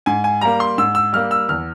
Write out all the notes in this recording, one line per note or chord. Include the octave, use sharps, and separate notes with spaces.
G#2 G#5
G#5
G3 A#3 A#5
C6
G#2 E6
E6
G3 A#3 F6
E6
E2 F6